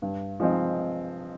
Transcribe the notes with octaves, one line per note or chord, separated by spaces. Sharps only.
G2
F3 G#3 C4 D#4